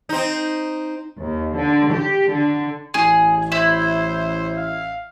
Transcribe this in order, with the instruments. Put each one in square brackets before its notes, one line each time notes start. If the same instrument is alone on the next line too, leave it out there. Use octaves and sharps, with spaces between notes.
[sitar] C4 D#4
[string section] D#2
D3
G4
D3
[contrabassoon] A1 [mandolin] G#4
[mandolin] E4 [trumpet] C5
[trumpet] F5